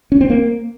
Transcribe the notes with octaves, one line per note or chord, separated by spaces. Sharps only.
C#4
C4
A#3